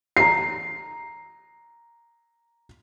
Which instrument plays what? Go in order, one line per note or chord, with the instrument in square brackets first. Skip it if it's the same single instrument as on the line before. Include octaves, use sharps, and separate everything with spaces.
[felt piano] A#5 C7